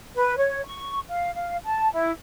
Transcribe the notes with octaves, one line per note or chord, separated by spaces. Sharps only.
B4
C#5
C#6
F5
F5
A5
E4